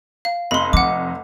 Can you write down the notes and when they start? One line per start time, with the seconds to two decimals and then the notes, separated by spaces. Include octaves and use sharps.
0.25 F5
0.51 F1 D#5 B5 C6
0.73 F3 F#5 D6